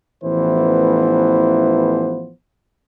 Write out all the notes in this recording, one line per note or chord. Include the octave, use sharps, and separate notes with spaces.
A1 E3 F3 B3 C5